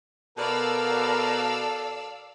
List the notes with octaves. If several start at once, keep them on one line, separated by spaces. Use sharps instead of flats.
B2 A4 A#4 D5 F5 E6